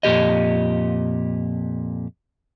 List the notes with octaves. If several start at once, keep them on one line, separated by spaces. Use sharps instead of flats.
F2 A#2 G4 D#5